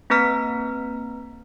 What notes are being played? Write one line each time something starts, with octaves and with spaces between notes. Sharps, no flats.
A#3 C4 B4 A#5 F6 B6